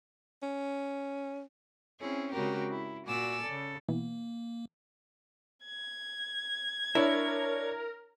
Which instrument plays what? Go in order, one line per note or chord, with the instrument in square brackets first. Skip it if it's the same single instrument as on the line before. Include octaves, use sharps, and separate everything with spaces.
[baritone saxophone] C#4
[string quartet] C4 C#4 E4 G#4
C#3 G#3 C4 F#4 G4 A#4
E4
A#2 F#4 D5 G#5 E6
C#3 A4
[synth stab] B2 E3 B3 [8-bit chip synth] A#3
[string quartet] G#6
[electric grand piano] D4 C#5 [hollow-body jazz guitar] E4 [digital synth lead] A#4